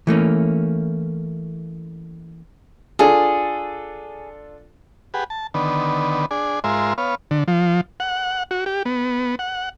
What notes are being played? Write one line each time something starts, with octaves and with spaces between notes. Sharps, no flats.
E3 A3 A#3 C#4
D4 F4 G#4 A4
G4 G#4 B4 F#5
A5
D3 D#3 B3
D4 G#4
G#2 G#3 F4 A#4 E5 C6
B3 C#5 F5
D3
F3
F#5
F#4
G4
B3
F#5